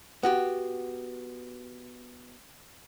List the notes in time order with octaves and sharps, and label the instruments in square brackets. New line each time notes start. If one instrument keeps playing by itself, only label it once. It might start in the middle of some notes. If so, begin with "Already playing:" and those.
[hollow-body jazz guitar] B3 F#4 G4